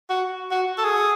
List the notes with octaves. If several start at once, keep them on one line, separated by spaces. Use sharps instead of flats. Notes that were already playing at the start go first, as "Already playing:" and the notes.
F#4
F#4
A4
G#4